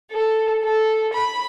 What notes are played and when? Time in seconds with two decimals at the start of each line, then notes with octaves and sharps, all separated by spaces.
0.11 A4
0.63 A4
1.13 B5